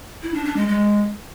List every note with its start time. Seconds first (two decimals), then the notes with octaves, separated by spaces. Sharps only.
0.23 E4
0.34 D4
0.45 D4
0.56 G#3
0.68 G#3